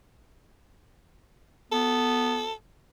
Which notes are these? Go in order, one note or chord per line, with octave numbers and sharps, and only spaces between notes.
B3 A4